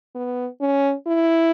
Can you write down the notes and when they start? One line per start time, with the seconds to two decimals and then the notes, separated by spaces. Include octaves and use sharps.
0.15 B3
0.61 C#4
1.07 E4